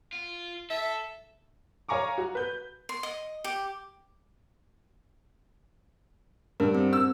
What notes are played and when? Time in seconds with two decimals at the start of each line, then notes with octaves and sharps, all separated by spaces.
0.13 F4
0.70 A4 E5
1.89 C#5 F5 G#5 A#5 C#6 D6
2.18 F#4
2.35 B4 G6
2.89 C6
3.03 D#5
3.44 G4
6.60 G2 A#4
6.75 C4
6.93 E6